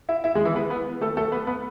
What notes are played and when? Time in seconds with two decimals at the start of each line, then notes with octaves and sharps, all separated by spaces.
0.09 E4 E5
0.24 E4 E5
0.35 G#3 G#4
0.45 E3 E4
0.55 B3 B4
0.70 B3 B4
1.01 A3 A4
1.17 A3 A4
1.32 B3 B4
1.47 B3 B4